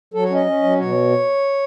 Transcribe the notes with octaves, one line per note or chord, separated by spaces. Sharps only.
F#3 A4
C#5
C#4 D#5
C#4
F#3
B2 C#5